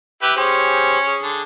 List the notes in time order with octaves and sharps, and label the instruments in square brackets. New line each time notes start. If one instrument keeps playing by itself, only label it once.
[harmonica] E4 G4 B4
[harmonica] C#4 [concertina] G4 G#4 C5
[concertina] G#4
[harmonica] D3